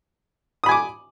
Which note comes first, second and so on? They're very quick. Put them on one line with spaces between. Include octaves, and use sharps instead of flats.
D#6 B5 G#5 D6